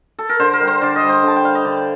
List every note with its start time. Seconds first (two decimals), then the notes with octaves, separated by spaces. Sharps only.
0.19 A4
0.29 A#4
0.39 D3 C5
0.53 A#4
0.61 G3
0.67 C5
0.82 D3 D5
0.96 D#5
1.03 G3
1.09 C5
1.23 D3 A5
1.36 G5
1.43 G3 F5
1.55 D#5
1.65 D3 D5